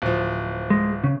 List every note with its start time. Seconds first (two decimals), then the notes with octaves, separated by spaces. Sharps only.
0.02 D1 F3
0.70 G#3
1.04 C#3